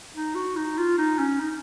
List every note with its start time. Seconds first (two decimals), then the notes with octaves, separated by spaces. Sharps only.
0.15 D#4
0.35 F#4
0.56 D#4
0.77 F4
0.98 D#4
1.19 C#4
1.40 D#4